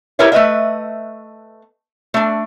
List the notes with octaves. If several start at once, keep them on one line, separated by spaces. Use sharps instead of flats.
E4 G4 A#4 B4 C#5 E5
A3 B4 D#5 E5
A3 D4